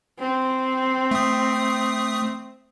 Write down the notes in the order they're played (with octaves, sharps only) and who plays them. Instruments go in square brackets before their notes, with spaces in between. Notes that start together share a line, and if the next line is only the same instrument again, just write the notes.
[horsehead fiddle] C4
[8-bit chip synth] A3 D#6